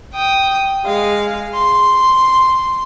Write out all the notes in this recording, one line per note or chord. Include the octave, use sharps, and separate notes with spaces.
G5 D#6
G#3 F5
C6